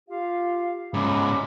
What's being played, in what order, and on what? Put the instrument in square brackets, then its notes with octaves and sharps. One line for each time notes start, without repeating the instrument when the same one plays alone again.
[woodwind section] F4 G4 F5
[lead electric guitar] G#2 C#3 [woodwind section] A#5 B5 D6